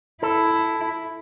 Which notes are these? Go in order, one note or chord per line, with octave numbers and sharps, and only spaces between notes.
E4 A4